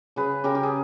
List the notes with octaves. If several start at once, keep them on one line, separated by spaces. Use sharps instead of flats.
C#3 G#4 B4
C#3 G4 A#4
G4
G#4